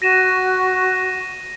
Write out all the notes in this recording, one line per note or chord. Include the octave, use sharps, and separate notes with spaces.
F#4 A#6 D#7 E7